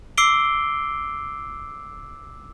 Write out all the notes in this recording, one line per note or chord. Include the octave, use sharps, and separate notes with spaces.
D6 E6 C7 D7 G7